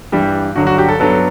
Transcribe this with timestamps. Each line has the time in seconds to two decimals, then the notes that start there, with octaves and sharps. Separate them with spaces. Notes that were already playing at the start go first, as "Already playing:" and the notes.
0.12 G2 E3 G3 G4
0.56 G2 D3 F#3 F#4
0.67 F#4
0.78 G4
0.89 A4
0.99 G2 F#3 B3 A4